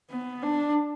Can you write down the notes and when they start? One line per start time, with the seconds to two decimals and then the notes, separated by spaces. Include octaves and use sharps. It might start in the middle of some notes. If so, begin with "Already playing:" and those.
0.10 B3
0.42 D4